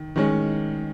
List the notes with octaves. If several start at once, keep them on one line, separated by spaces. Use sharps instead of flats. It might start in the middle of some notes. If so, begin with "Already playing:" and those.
Already playing: D#3
D#3 G#3 C#4